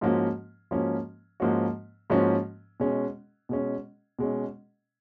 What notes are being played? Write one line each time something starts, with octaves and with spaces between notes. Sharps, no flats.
G#2 F3 A#3 C#4 F#4
G#2 F3 A#3 C#4 F#4
G#2 F3 A#3 C#4 F#4
G#2 F3 A#3 C#4 F#4
B2 G#3 C#4
B2 G#3 C#4
B2 G#3 C#4